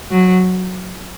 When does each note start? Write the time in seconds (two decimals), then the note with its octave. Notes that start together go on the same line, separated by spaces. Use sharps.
0.11 F#3